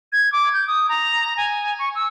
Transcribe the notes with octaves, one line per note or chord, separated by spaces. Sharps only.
G#6
D6
G6
D#6
A#5
G#5
C#6
E6